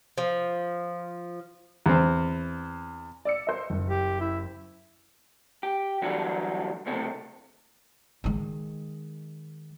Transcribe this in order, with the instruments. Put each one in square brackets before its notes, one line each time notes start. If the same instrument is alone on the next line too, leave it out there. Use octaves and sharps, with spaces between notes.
[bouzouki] F3
[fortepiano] E2 C4
[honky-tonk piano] D5 E6 C#7
C5 D#5
F#1
[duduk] G4
E4
[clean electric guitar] G4
D3 E3 F#3 G3 F#4
C#2 A2 C3 A3
[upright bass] D#3 G#3